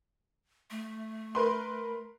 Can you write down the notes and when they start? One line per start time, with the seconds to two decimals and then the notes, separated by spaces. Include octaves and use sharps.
0.71 A3
1.35 A#4 B4 C6